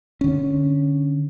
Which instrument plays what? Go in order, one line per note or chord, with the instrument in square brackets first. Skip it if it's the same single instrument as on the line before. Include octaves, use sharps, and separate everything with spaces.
[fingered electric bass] D3 C#4